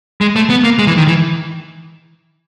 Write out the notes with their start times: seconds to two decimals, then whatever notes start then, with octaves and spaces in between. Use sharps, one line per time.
0.21 G#3
0.36 A3
0.50 B3
0.64 A#3
0.79 G#3
0.87 E3
0.98 D#3
1.07 E3